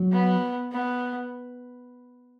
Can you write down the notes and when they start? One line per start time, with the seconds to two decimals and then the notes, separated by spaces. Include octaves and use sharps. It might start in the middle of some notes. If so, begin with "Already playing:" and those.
Already playing: F#3
0.12 B3
0.72 B3